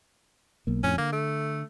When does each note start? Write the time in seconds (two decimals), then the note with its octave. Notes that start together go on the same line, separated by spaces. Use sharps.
0.67 B1 A#3
0.83 F2 A2 C#4
0.98 D3 A#3
1.13 A3